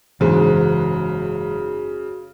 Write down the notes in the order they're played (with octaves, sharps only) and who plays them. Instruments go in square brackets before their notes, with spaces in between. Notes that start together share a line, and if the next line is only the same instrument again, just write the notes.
[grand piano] F#1 G#2 C5 [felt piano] C#3 [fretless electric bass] E3 [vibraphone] F#4